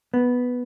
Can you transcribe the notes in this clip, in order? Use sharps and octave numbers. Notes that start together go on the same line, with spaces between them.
B3